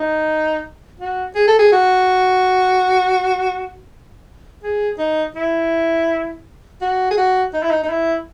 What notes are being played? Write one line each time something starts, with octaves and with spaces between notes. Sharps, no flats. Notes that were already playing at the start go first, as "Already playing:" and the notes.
Already playing: D#4
F#4
G#4
A4
G#4
F#4
G#4
D#4
E4
F#4
G#4
F#4
D#4
E4
D#4
D#4
E4